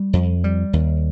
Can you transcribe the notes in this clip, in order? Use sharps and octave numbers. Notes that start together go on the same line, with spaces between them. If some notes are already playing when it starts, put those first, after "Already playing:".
Already playing: G3
F2
G3
D#2